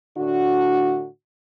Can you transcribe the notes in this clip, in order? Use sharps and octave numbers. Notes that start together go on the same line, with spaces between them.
A2 D3 D4 F#4